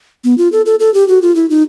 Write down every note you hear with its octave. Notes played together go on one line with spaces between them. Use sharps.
B3
F4
A4
A4
A4
G4
F#4
F4
E4
D#4